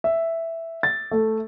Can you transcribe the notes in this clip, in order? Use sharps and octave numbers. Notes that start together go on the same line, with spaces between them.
E5
A6
A3